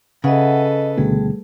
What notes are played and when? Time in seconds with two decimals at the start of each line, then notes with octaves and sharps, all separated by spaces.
0.24 C#3 A4 B4 D#5 E5 F#5
0.58 D#5
0.97 D2 B2 D3 G3 A3 G#4